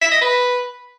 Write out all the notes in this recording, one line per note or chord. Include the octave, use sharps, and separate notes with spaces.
E5
D#5
B4